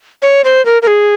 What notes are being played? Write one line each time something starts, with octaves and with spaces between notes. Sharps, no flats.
C#5
C5
A#4
A#4
G#4